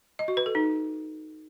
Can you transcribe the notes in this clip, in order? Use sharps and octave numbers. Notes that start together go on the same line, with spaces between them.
D#5
F#4
B4
A4
D#4